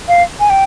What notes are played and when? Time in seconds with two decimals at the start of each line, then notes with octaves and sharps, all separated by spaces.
0.08 F5
0.40 G#5
0.50 G5